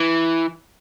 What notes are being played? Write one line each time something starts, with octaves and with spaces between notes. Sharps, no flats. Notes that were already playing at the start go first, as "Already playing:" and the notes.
Already playing: E3